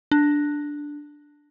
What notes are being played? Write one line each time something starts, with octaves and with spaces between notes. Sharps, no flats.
D4